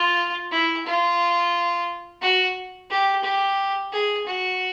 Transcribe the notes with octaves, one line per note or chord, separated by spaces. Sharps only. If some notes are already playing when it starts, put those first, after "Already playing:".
Already playing: F4
E4
F4
F#4
G4
G4
G#4
F#4